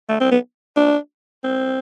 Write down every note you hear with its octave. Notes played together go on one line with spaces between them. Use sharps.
A3
C4
B3
D4
C4